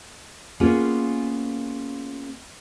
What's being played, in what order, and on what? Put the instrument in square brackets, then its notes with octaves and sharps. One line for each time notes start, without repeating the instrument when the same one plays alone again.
[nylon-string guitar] A#3 B3 C#4 F4 G#4